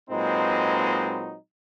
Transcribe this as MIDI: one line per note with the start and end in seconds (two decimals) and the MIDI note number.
0.10 1.36 46
0.10 1.36 54
0.10 1.36 56
0.10 1.36 60
0.10 1.36 63
0.10 1.36 71